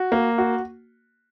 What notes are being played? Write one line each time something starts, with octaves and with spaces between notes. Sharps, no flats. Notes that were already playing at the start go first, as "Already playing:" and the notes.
Already playing: F#4
A#3
F#4